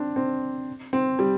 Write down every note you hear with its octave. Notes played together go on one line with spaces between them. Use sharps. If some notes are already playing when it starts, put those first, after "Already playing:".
Already playing: C4 D4
C4
C4
G3